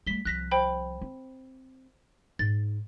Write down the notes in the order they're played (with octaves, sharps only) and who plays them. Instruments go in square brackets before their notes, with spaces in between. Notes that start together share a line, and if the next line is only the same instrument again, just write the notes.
[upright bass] G3 A3 [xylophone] B6 G7
[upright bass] C2 F3 [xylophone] F#6 A#6 B6
[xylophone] C5 G5 B5
[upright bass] C4
[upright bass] G#2 [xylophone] A6